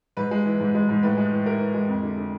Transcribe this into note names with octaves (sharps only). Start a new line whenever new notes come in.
G#2 B4
G#3
E3
G#2
G#3
G#2
A2 B4
G#3
E3
E3 A#4
E3
G#3
F2
D3
D3